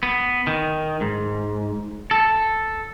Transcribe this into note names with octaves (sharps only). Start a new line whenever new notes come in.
B3
D#3
G#2
A4